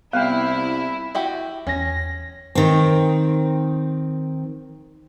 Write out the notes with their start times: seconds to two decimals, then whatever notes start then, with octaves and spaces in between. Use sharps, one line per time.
0.13 C2 B3 E4 F5 G5
1.15 E4 F#4 G4
1.67 E2 C#4 A#6
2.55 D#3 C4